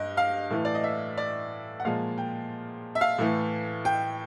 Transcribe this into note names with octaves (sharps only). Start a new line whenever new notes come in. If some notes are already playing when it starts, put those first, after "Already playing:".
Already playing: G2 D#5
F5
A2 E3 A3
D5
D#5
E5
D5
F#5
A#2 F3 G#3 F5
G5
E5
F5
A2 E3 A3
G5